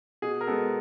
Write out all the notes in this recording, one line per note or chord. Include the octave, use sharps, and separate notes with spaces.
B2 G#4
A#4
G#3 B3 A4